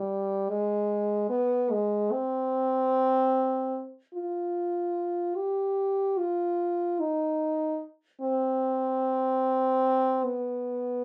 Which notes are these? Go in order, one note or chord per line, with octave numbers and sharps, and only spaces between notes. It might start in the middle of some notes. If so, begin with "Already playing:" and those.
Already playing: G3
G#3
B3
G#3
C4
F4
G4
F4
D#4
C4
B3